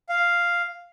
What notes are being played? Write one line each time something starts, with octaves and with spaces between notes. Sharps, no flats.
F5